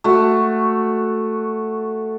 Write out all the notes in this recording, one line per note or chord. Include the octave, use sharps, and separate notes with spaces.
A3 F#4